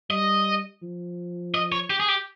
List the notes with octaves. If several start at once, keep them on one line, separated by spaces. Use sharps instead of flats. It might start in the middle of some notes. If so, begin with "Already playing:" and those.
G3 D#5
F3
D#5
C#5
G4
G#4
G4